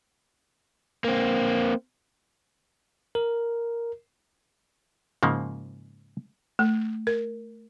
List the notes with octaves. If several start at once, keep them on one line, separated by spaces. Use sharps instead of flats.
A#3 C4
A#4
G#2 C#3 F3 A#3
A3
A#4